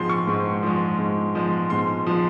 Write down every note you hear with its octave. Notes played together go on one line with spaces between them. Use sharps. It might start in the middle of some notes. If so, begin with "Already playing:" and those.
Already playing: G#2 F3 G#3 C6
C#6
G#2
F3 G#3
G#2
F3 G#3
G#2 C6
F3 G#3